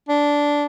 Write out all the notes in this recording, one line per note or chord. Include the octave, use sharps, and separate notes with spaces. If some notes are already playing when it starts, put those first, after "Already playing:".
D4